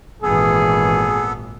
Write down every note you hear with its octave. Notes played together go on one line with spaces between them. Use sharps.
G#1 A#2 E3 B3 G#4 A4